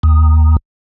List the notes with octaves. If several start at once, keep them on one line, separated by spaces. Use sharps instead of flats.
D#2